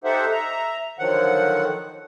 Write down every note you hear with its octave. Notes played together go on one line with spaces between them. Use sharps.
D#4 G4 A4 C5 E5 F#5
E5 A#5
D3 D#3 F3 F#3 F#5